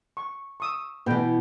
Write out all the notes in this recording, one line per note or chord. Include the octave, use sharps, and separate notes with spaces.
C#6
C#6 D#6 E6
B2 E3 B4 G5